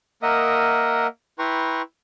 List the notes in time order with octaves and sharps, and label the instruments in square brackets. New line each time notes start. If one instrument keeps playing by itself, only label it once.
[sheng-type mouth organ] A#3 A#4 D#5 E5 F#5 D#6
E4 B4 G5 A#5 C6 C#6